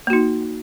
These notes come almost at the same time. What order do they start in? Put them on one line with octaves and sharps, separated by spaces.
A#3 F#4 D#4